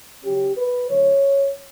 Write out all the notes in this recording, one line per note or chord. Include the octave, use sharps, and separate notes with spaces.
C#3 F#3 C#4 G4
B4
D2 D3 F#3 C#5